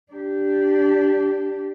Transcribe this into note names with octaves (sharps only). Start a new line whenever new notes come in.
D4 G4